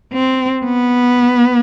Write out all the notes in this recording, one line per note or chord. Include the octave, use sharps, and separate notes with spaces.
C4
B3